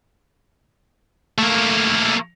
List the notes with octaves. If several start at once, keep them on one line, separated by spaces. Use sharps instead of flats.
A3 A#3